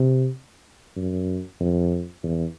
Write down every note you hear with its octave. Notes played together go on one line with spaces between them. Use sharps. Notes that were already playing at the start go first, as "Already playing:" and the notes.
Already playing: C3
F#2
F2
E2